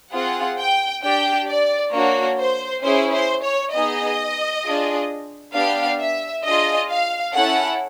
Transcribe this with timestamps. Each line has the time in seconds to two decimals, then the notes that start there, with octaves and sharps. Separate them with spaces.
0.12 C4 F4 G#4 F#5
0.58 G5
1.03 D4 G4 G5
1.48 D5
1.93 A#3 D4 F#4 C#5
2.39 C5
2.83 C#4 E4 G#4 C5
3.13 C5
3.43 C#5
3.73 B3 D#4 G#4 D#5
4.65 D4 F4 G#4
5.54 B3 D4 G4 F5
5.99 E5
6.45 D4 F4 G#4 D#5
6.89 F5
7.34 C#4 E4 A4 F#5